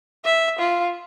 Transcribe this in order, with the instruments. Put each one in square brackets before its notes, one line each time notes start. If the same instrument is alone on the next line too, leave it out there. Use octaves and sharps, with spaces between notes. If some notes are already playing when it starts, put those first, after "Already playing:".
[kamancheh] E5
F4